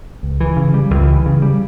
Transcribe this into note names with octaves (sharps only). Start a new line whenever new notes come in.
C#2
E3
C#3
G3
C#2
E3
C#3
G3